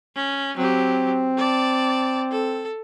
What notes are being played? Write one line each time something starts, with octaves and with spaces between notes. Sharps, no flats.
C#4
F#3 C4 G4
D5 A5
A4